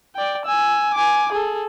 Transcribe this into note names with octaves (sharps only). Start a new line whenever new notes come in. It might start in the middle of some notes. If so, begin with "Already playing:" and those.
D5 G5
G#5 E6
G#5 D6
G#4 A4